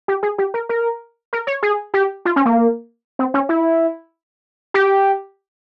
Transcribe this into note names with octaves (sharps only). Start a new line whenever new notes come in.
G4
G#4
G4
A#4
A#4
A#4
C#5
G#4
G4
F4
C#4
A#3
C4
C#4
E4
G4